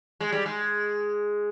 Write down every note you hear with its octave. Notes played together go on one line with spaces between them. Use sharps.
G#3
G3
G#3